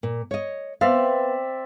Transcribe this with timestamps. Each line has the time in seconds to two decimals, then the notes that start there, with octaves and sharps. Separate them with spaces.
0.03 A#2
0.31 C#5 D#5
0.81 B3 C4 D5 E5 F5